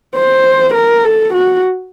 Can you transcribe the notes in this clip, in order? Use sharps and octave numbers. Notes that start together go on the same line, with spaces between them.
C5
A#4
A4
F#4